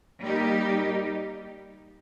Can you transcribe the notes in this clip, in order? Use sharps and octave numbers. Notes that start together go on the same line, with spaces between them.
G3 A#3 D#4 G4